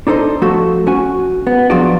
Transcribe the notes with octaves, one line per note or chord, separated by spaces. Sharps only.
D4 D#4 A4 C5 D#5
F3 A3 F#4 A4
C#4 F#4 G#5
B3
F3 F#3 B3 D4 F#4 D5